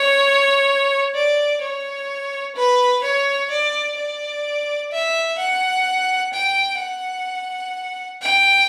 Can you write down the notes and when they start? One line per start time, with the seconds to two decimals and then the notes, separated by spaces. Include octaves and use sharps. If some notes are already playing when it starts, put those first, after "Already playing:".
Already playing: C#5
1.15 D5
1.61 C#5
2.56 B4
3.03 C#5
3.51 D5
3.97 D5
4.91 E5
5.38 F#5
6.33 G5
6.79 F#5
8.22 G5